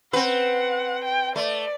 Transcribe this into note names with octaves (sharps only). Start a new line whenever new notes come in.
C4 B4 F#5
G5
A3 D5